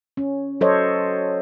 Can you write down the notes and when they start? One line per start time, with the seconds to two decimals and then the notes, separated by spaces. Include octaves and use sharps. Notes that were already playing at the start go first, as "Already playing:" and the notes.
0.17 C#4
0.61 F#3 A4 C5 C#5 D#5